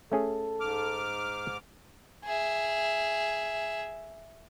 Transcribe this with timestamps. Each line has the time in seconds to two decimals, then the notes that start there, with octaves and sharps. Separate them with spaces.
0.12 A3 C#4 G#4 A4
0.60 G#2 D6 F6
2.25 G#4 E5